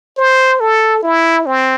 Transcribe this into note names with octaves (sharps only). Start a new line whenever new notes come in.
C5
A4
E4
C4